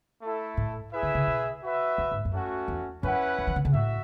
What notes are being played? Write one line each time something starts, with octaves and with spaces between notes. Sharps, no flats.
A3 E4 A4
A2
E4 G#4 B4 E5
D3
C#3
B2
F#4 B4 E5
F#2
G#2
F#2
A3 C#4 F#4
E2
F#2 C#4 E4 B4 F#5
F#2
E3
D3
C#3
A2 F#4 E5